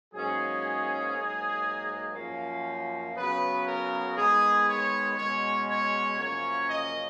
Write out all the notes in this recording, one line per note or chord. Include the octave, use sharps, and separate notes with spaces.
G#2 F#3 A#3 C#4 G#4
G#2 F#3 A#3
F#2 F3 A#3 C#4
C#3 F#3 B3 B4
A#4
D#3 G#3 B3 G#4
C#5
B2 G#3 C#4 C#5
C#5
F#2 C#3 F3 A#3 C#4 C#5
D#5